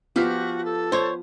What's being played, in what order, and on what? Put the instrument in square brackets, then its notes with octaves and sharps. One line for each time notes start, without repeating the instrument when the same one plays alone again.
[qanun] F3 G4 [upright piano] B3 F6 B6 [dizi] F#4
[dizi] A4
[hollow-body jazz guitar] C5 C#5